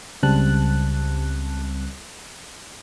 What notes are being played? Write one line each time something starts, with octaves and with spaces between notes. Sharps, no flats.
C#2 C#3 G3 C4 A5 F#6